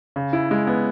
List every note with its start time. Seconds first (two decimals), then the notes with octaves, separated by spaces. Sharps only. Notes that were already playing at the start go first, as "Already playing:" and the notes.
0.16 C#3
0.33 E4
0.51 G#3
0.67 B3